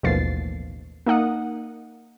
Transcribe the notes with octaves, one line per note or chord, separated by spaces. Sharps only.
A1 D#2 B2 F3 A6 C7
A#3 D#4 F#5 D#6